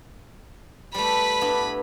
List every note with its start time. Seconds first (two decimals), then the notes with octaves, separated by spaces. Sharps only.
0.95 G3 A3 B4 B5
1.41 G2 B3 E4